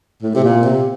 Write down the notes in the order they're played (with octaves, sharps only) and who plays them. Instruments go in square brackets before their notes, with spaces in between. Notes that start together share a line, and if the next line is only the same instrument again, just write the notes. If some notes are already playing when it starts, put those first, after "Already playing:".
[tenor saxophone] A2
C3
A#2
C3